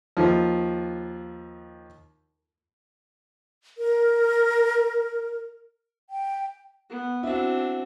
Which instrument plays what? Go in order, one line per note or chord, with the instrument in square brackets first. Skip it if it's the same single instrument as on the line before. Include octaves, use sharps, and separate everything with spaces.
[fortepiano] D#2 F3
[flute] A#4
G5
[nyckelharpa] B3
[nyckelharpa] C4 D4 [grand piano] E4 F#4